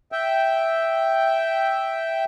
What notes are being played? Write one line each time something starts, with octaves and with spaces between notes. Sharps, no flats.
E5 G5